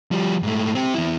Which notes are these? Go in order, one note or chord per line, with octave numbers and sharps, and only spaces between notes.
F3 G3
G#2 A3
C4 G4
E2 E4